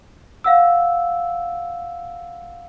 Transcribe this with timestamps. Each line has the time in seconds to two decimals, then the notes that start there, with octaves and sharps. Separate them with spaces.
0.44 F5 F#5 E6